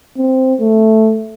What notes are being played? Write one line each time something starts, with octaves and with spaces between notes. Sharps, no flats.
C4
A3